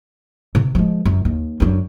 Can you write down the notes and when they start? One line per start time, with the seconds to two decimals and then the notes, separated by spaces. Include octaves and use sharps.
0.55 C3
0.75 F3 G#3
1.05 F#2
1.25 D#2
1.60 F#2 D4